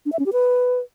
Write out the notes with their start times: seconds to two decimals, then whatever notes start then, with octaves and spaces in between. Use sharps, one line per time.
0.06 D4
0.12 E5
0.19 C#4
0.26 G4
0.33 B4